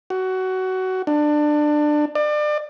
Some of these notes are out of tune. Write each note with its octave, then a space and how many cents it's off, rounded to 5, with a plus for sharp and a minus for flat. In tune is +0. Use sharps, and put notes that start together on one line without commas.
F#4 +20
D4 +20
D5 +30